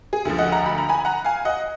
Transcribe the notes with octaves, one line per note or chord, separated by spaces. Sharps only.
G#4
D2 D3 F3
D#5 F#5
F#5 A#5
B5
A#5
G#5 B5
F#5 A#5
F5 G#5
D#5 F#5